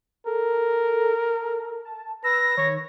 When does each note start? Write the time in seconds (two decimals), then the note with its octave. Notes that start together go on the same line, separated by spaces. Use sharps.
0.26 A4 A#4
1.36 A4
1.85 A5
2.24 B4 E6 A#6
2.57 D#3 C#5